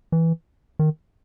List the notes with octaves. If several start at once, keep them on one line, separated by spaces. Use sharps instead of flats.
E3
D#3